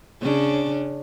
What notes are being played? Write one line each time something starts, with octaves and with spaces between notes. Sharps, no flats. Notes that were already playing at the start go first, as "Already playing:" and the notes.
C#3 C#4 D4